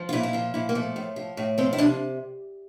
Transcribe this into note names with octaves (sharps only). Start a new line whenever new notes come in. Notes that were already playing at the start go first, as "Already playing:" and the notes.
Already playing: F3
F4
A#2 E4
E4
F3 F4
A#2 E4
A#3
F3 A3
A2
F3
A2
F3 C4
E4
C3 D4